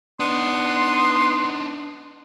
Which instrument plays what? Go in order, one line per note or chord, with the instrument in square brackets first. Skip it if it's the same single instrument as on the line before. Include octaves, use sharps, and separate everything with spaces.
[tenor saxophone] B3 [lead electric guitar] D4 D#4 [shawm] C6